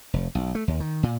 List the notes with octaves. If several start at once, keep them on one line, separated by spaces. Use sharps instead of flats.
F1
B1
A3
D#2
D#3
A#2